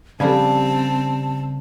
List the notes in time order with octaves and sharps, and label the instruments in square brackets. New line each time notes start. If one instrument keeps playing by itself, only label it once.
[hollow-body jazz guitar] C#3 G3 D4 [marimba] F3 G4 A4 [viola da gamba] C4 [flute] A5